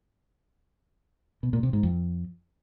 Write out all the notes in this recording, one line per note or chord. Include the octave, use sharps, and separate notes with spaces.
B2
A#2
C3
G#2
F2